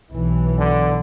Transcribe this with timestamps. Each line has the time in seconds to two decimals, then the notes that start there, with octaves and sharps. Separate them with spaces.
0.10 B1 E3
0.59 D3